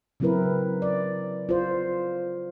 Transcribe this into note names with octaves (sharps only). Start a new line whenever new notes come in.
C#3 F#3 C4 E4 A#4 B4
D5
F4 C5